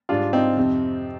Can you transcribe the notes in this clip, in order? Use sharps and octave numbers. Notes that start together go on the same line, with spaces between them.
G#2 G3 D4 F4
C4 D#4
F2 C3 F3